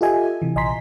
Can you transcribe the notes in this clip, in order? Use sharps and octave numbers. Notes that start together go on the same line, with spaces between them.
F4 G4 A4 D#5 E5 G#5
C3 E3
A#1 D#5 G#5 A#5 C6 B6